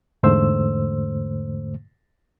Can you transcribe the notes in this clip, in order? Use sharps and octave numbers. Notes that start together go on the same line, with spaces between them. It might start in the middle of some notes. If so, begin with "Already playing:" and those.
E2 G#2 D3 A3 C5 E6